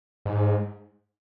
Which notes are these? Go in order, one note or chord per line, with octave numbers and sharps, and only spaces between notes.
G#2